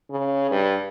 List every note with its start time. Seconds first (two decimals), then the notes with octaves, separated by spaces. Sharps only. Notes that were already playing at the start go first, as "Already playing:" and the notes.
0.11 C#3
0.51 G2